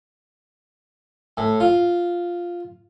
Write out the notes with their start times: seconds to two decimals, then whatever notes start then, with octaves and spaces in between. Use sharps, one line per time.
1.37 A2
1.60 F4